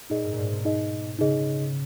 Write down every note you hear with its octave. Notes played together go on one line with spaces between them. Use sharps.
A#2 D#4 G#4 D#5
G#2
A#2
G#2
B2
D#4 G#4 D#5
C#3 D#4 G#4 D#5